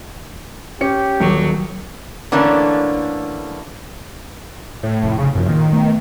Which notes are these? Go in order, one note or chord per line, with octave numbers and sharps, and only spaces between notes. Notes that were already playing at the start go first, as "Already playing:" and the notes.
C#4 G4 C#7
D#1 F#3
D3 E3 A3 A#3 C#4 D4
A2
F1
C#3
F#2 C3 E3 F3
A#2 D#3
A3 B3